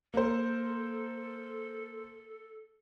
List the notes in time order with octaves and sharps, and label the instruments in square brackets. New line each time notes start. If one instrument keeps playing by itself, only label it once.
[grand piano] A#3 A#4 C5 [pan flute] A4